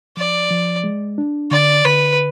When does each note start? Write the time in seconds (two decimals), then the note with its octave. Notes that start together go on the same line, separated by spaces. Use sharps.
0.17 F3 D5
0.51 F3
0.84 G#3
1.18 D4
1.51 D3 D5
1.84 D3 B4